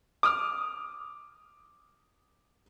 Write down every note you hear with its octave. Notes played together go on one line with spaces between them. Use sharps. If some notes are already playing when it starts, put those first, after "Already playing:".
D6 D#6 F6